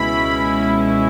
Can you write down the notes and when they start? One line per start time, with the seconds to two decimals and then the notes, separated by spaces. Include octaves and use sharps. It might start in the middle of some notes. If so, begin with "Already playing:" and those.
Already playing: C#2 B2 G#3 C#4 E4 B5